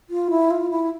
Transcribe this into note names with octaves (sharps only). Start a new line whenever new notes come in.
F4
E4
F4
E4